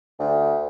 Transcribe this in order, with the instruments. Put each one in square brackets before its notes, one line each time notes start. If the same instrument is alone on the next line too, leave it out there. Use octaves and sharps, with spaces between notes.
[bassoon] D2